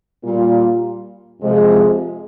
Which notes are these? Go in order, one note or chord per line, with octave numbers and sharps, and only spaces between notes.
A#2 G3 A#3 F4
F2 C3 F3 G#3